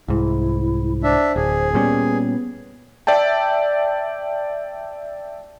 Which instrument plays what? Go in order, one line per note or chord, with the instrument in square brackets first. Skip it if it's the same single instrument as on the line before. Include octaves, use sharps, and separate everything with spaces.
[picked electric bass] C2 G#2 [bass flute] E4
[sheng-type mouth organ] D4 E5 [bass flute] C5
[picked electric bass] D1 [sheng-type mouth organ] G#4
[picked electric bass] A#2 G3 C#4 [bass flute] B3
[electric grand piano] D5 E5 G5 A5